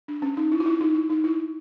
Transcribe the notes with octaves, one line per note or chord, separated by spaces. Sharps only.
D4
C#4
D#4
E4
F4
E4
D#4
E4
D#4
E4